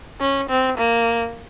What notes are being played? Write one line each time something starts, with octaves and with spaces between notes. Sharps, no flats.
C#4
C4
A#3